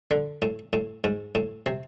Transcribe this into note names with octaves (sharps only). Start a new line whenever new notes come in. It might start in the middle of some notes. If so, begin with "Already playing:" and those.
D3
A2
A2
G#2
A2
C3